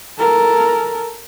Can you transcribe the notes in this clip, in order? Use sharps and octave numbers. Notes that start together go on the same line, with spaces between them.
A4 A#4